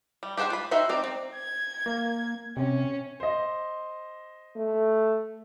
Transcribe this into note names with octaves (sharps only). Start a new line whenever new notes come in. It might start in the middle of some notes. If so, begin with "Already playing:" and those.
G3
G4 G#4 C5 F#5 G#5
F4 B5
D#4 F#4 C5 E5 G5
C4 D#4 D5
C4
G#6
A#3
C3 C#4
C5 D#5
A3